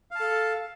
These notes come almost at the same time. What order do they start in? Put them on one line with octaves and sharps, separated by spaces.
F5 A5 A4